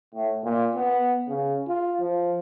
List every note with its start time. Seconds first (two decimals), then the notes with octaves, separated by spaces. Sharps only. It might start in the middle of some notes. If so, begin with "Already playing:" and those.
0.15 A2
0.44 A#2
0.76 B3
1.28 C#3
1.68 F4
2.01 F3